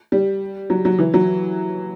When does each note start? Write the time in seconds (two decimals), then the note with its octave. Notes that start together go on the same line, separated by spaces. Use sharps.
0.12 G3
0.70 F#3
0.85 F#3
0.99 E3
1.14 F#3